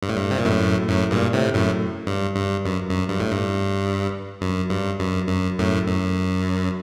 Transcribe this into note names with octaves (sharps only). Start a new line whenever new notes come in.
G2
A2
G2
C3
A#2
F#2 A2
F#2 A2
G2 A#2
A2 C3
F#2 A2
G2
G2
F#2
F#2
G2
A2
G2
F#2
G2
F#2
F#2
F#2 A2
F#2